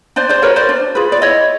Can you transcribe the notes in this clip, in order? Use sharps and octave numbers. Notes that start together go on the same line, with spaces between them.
D4 C5 D5
C5 D5
F#4 A#4 B4 C#5
C5 D5
D4
F4 G#4 B4
D5
E4 C#5 D#5